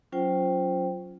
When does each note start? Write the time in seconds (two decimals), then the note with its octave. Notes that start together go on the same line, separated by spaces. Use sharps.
0.12 F#3 C#4 F4 C5 G5